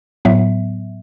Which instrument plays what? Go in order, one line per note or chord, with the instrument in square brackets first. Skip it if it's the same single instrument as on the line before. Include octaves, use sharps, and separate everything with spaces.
[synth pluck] A2 F#3 B3 E5